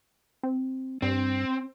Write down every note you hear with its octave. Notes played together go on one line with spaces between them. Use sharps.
C4
G2 C4